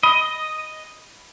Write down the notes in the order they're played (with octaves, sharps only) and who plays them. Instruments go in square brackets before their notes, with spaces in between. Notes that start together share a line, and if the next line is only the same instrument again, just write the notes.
[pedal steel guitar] D#5 [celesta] B5